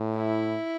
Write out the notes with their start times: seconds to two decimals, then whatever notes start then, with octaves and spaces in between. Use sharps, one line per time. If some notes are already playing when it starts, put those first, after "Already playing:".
Already playing: A2
0.17 E4